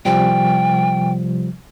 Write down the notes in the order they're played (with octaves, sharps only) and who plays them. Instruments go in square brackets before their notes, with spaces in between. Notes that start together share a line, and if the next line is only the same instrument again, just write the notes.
[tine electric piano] C3 F3 G3 [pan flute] G5